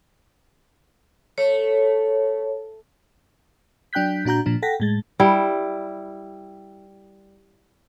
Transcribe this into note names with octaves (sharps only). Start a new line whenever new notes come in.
A3 C#5
F#3 D4 G5 F#6 G6 B6
A#2 D4 F#4 A#5 G6
A#2 F3 D4
A4 F#5 G5 A#6 B6
A2 G#3 A6
G3 E4